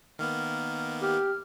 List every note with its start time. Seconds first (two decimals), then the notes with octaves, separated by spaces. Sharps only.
0.19 D#3 A#3 B3 F6
1.02 G4 F6